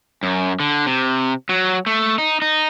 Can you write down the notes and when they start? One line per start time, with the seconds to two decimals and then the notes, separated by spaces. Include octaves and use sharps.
0.23 F#2
0.60 D3
0.86 C3
1.49 F#3
1.86 A3
2.18 D#4
2.42 D#4